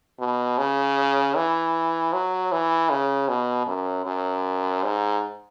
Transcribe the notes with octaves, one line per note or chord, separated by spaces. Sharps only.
B2
C#3
E3
F#3
E3
C#3
B2
F#2
F#2
G#2